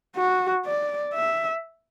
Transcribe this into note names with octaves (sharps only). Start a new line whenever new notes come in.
F#4
D5
E5